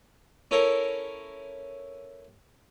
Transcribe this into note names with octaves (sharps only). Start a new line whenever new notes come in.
C#4 E4 A4 A#4